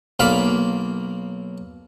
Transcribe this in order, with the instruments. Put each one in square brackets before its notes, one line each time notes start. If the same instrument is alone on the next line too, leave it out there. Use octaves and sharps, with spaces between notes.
[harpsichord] B1 A#3 D5 F5 B5